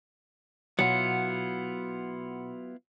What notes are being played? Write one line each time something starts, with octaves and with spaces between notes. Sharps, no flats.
B2 F#3 B3 E4 F4 F#5 C#7